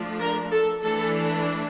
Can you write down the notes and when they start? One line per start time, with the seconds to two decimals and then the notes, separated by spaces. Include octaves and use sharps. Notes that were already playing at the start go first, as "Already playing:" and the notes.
Already playing: F3 A3 D4
0.21 A#4
0.52 A4
0.83 E3 A3 D4 A4